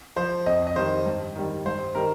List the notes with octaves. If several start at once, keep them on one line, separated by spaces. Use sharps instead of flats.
F3 C5
F2 D#5
D#5
D#3 G3 C5
G2
D#3 G3
G2 C5
D#3 G3 A#4